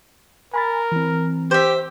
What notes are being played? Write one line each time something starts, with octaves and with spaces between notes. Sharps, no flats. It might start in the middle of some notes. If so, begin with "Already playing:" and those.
A#4 G#5 B5 A6
E3 C4
G4 C5 E5